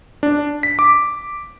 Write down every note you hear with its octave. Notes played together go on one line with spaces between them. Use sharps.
D4
B6
D6